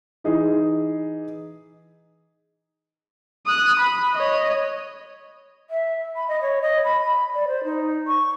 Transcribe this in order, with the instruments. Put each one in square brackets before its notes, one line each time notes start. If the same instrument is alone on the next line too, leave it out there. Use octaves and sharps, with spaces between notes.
[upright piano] E3 D#4 G#4
[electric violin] D#6 F#6
B5
C#5 D#5
[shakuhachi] E5
B5
D#5
C#5
D#5
B5
B5
D5
C5
D#4
C#6